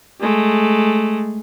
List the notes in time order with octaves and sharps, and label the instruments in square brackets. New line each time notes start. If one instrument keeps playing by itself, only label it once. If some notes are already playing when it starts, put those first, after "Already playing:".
[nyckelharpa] G#3 A3